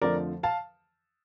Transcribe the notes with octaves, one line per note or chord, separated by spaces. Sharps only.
F2 D3 F3 A3 A#4 D5
F5 A5